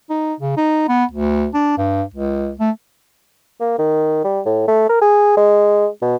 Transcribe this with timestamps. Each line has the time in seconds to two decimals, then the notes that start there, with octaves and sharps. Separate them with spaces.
0.10 D#4
0.40 C#3
0.57 D#4
0.88 B3
1.12 D2
1.54 D4
1.78 G2
2.14 C#2
2.60 A3
3.60 A#3
3.78 D#3
4.24 G3
4.46 A2
4.68 A3
4.89 A#4
5.01 G#4
5.37 G#3
6.02 B2